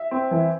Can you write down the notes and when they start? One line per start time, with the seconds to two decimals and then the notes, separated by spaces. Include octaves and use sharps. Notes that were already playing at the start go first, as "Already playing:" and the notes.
Already playing: E5
0.11 C4
0.31 E3